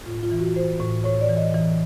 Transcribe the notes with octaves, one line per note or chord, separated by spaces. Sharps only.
A2 F4
F4
E3
F#4
E3 C5
A2
A2 C#5
D5
E3
D#5
E3